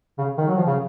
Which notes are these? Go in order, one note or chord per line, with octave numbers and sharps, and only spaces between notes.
C#3
D#3
F#3
F3
C#3